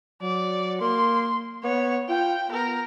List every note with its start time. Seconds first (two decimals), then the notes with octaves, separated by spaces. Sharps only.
0.22 F#3 D5
0.81 A#3 C6
1.64 B3 C#5
2.09 F4 G5
2.51 B3 A#4